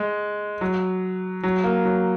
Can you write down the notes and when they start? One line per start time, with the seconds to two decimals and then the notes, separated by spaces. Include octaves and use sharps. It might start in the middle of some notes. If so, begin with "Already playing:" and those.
Already playing: G#3
0.61 F#3
1.43 F#3
1.64 A#3
1.85 F#3